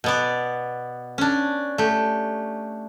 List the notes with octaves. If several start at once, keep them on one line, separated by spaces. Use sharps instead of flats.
B2 B3 D5
C#4 D4
A3 G4